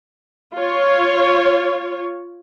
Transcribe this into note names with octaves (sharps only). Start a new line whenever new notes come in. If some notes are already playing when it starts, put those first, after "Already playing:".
F4 C#5